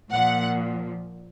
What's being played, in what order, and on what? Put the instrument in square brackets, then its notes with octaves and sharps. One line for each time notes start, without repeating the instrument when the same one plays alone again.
[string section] A#2 F3 F#5